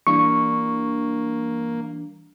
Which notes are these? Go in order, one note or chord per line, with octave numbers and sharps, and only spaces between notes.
E3 G3 A#3 D4 C#6